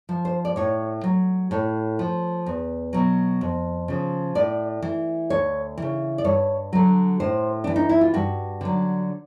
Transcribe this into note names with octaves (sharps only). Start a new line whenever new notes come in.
F3
C5
D5
A2 C#5
F#3
A2 C#5
F3
E2
B2 F#3
F2
C#3 F3
A2 D5
E3
D2 C#5
C#3 E3
D5
G2 C#5
D3 F#3
A2 C5
E3 D4
D#4
E4
F4
G2 F#4
D3 F#3